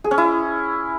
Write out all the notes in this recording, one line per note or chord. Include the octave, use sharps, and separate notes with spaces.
G#4
C#4
E4